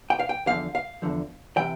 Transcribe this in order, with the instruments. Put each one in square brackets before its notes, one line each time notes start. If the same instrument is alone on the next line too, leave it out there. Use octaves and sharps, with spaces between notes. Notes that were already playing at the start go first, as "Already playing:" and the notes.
[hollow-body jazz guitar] G5
F5
G5
E2 D3 F3 F5
F5
E2 D3 F3
C3 E3 G5